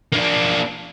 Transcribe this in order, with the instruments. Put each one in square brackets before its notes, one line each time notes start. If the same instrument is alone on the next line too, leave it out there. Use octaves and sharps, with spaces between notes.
[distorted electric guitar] A#3 D4